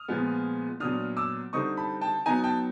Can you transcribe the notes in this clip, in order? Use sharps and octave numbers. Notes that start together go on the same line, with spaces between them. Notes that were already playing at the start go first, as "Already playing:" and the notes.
Already playing: D#6 F6
A#2 F3 G#3 B3
A#2 F#3 B3 D4 D#6 F6
D6 E6
D3 G3 C4 D#4 C#6 D#6
A5 B5
G5 A5
F#3 B3 D#4 G#5 A#5
G5 A5